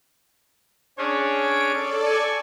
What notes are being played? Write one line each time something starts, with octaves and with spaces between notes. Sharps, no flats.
C#4 D4 G#4 C#5
D7
A4 D5
G#5 C#6